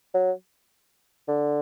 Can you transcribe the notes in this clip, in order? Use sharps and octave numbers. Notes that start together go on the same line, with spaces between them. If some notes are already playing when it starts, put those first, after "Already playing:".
F#3
D3